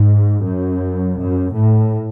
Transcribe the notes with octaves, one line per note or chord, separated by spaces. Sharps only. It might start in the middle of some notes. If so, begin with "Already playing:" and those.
Already playing: G#2
F#2
F#2
A2